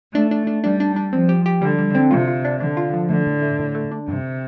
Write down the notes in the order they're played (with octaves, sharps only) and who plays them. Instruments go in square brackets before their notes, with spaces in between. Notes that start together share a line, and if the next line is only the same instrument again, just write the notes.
[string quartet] A3 [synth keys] D4
[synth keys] D4
D4
[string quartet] G3 [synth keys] D4
[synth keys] D4
D4
[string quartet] F3 [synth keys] C4
[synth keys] G4
G4
[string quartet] D3 [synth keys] G3
[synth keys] G3
C4
[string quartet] C3 [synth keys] F4
[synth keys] F4
D4
[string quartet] D3 [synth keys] D4
[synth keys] F4
F3
[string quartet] D3 [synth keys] A3
[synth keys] A2
A3
A2
A3
D4
[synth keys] G2 [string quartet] C3